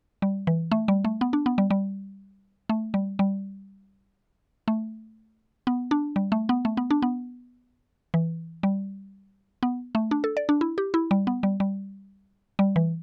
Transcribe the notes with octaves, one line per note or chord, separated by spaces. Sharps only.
G3
E3
A3
G3
A3
B3
D4
B3
G3
G3
A3
G3
G3
A3
B3
D4
G3
A3
B3
A3
B3
D4
B3
E3
G3
B3
A3
D4
A4
D5
D4
E4
G4
E4
G3
B3
G3
G3
G3
E3